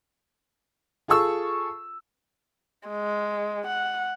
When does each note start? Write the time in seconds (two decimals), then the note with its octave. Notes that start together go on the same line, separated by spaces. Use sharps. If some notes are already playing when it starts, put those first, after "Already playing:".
1.08 F4 G#4 A4 C#6 E6
2.88 G#3
3.67 F#5